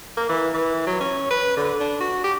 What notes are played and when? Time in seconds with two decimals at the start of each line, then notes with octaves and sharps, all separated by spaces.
0.17 A#3
0.29 E3
0.54 E3
0.87 F#3
1.00 C#4
1.30 B4
1.57 D3
1.80 D4
2.00 F#4
2.24 G4